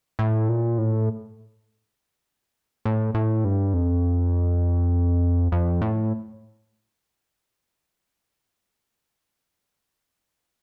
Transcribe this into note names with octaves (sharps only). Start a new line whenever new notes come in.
A2
A#2
A2
A2
A2
G2
F2
F2
A2